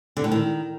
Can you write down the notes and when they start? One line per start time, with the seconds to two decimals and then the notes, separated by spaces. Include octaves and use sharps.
0.17 D3
0.24 A2
0.31 D#3